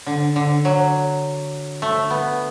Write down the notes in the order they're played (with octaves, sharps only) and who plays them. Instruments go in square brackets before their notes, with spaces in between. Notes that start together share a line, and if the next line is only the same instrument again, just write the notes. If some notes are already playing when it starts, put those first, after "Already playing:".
[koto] D3
D3
F#3
A3
B3